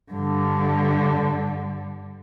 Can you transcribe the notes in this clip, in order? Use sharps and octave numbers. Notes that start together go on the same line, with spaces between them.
G2 D3